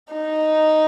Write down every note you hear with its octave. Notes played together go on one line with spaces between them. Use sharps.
D#4